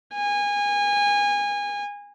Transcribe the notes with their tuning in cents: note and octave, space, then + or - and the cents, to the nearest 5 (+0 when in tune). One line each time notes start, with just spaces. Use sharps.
G#5 -25